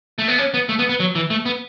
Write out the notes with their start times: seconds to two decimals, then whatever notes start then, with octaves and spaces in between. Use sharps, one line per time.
0.18 A3
0.28 B3
0.38 C#4
0.54 B3
0.69 A3
0.79 B3
0.89 B3
1.00 F#3
1.15 E3
1.30 A3
1.46 B3